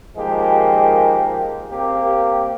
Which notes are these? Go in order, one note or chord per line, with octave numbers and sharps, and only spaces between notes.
D#3 F3 G#3 A#3 G4
A#3 C4 G4